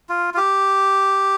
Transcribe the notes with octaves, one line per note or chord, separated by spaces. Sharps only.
F4
F4
G4